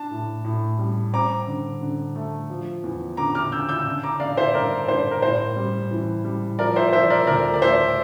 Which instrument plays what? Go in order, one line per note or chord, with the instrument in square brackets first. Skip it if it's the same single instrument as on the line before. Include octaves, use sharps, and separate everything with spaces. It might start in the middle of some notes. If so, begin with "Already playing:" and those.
Already playing: [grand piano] D4 A5
A2
A2
G3
C4 A#5 D6
D3
D3
A3
F3
E2
D3 A#5 D6
D6 F6
D3 E6 G6
E6 G6
D4
A#5 D6
D3 D5 F5
C5 E5
G2 A#4 D5
G2 C5
A#4
A2 C5
G3
E3
G3
F3 A#4 D5
C5 E5
F3 C5 E5
A#4 D5
D2 A#4 D5
D5
A3 C5 E5